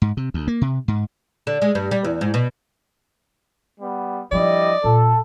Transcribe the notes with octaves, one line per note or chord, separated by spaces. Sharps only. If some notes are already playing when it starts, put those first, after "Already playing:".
G#2
C3
D2
A#3
C3
G#2
D3
G#3
G2
G3
E2
G#2
B2
G3 B3
F3 G3 D4 E4 D5 D#5
A#2 A4